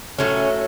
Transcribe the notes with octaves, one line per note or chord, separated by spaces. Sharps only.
A2 F#3 A3 C#4